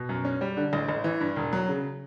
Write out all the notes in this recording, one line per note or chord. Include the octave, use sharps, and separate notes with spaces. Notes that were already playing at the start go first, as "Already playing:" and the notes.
Already playing: B2
F#2
C#4
G3
D3
A1
A1
E3
G2
E1
F#3
C#3